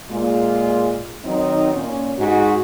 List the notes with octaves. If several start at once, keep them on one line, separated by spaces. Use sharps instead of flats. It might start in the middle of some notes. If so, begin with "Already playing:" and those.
A#2 G#3 F4
D#3 F#3 C4 D#4
A#2 C#4
G#2 F#4